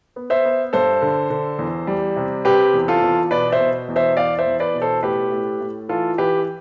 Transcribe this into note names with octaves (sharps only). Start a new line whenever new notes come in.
B3
C5 E5
B3
G2 A4 C5
D3
D3
E2
G3
C3
C3 G4 B4
E2
F4 A4
E2
B2 B4 D5
C5 E5
B2
E2
C5 E5
E2 D5 F5
C5 E5
E2
B4 D5
B2
A4 C5
A2 G4 B4
A2
A2
E3 F4 A4
E3 G4 B4